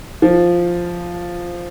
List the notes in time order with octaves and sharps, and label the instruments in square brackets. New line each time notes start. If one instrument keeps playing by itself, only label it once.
[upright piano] F3